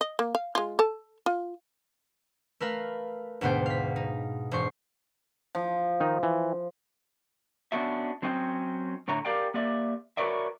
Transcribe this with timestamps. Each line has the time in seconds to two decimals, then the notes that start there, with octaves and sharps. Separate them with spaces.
0.01 D#5
0.19 A#3
0.35 F5
0.55 G#3 F4
0.79 A4 A5
1.26 F4
2.60 A3 A#4 B4 F5
3.41 D2 G#2 B2 B3 C5 G5
3.66 F5 B6
3.96 D#4
4.51 E1 G#2 C5 C#6 C7
5.55 F3
6.00 D#3 D#4
6.23 E3
7.72 B3 C#4 D4 F#4 E5
8.22 F#3 C4 C#4 D#5 F5 G5
9.08 A2 D3 C#5 E5 A#5
9.25 G4 A#4 D5 F5 G5
9.54 A#3 G4 D5 E5
10.17 F#4 A#4 B4 C#5 D5 E5